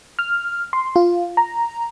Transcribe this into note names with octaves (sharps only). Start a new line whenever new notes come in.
F6
C6
F4
A#5